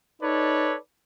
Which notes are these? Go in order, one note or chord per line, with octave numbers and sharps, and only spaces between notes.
D#4 A4 B4 C#5 D5